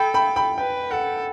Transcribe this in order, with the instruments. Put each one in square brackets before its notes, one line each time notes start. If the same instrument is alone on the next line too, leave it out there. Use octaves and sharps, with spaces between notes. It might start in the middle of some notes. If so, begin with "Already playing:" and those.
Already playing: [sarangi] A4 [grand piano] G5 B5
[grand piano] G5 B5
G5 B5
[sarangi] B4 [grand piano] G5
[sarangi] A4 [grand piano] F#5